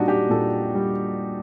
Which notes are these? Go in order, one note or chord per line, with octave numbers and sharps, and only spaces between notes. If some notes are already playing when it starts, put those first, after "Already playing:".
Already playing: A#2 G3 D4 D#4 F#4
G4
A#2 A4
G3